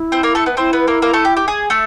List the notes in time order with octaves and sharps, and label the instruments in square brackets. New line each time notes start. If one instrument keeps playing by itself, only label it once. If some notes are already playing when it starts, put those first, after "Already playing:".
Already playing: [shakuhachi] E4
[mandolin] C4 C5
A#3 A#4
A3 A4
B3 B4
[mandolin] C4 C5 [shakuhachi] E4
[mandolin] B3 B4
A#3 A#4
A#3 A#4
A3 A4
G4
G4
G#4
A3 A4